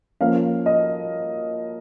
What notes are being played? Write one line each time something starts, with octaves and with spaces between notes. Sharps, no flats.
F3 A#3 C#4 F5
D#5